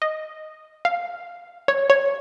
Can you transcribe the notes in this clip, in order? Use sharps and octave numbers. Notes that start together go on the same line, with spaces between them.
D#5
F5
C#5
C#5